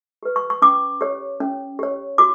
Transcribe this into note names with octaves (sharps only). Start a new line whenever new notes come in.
G4 B4
C#6
C#6
C#4 D6
G4 C#5
C#4
G4 C#5
F#4 D6